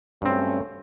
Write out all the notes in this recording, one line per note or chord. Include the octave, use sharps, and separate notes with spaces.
G2 F#3 A3 C4 C#4